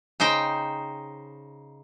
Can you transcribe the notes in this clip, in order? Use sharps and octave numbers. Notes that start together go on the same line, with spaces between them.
C#3 D#4 C5 G5